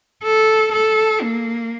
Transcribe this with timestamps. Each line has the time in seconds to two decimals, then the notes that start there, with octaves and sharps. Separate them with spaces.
0.24 A4
0.72 A4
1.22 A#3